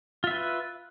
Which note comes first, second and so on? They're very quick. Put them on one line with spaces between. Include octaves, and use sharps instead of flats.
F4 E5 B4